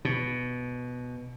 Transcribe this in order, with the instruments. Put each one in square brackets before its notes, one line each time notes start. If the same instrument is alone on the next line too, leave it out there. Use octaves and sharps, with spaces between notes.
[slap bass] B2